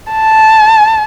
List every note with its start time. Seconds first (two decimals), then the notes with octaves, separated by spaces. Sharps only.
0.12 A5